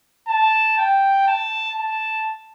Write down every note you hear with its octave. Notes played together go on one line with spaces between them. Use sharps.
A5
G5
A5
A5